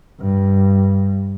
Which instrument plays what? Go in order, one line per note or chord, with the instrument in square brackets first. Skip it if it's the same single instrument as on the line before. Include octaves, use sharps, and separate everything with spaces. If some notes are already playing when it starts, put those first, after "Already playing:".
[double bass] G2